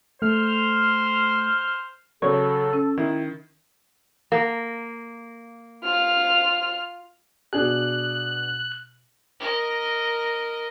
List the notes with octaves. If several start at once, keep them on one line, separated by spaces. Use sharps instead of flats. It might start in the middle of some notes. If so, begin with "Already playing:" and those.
A3 C5 F6
C#3 F#3 A4 C#5
C#4
D#3 E4
A#3
F4 F6
B2 D4 G#4 F#6
A#4 D#5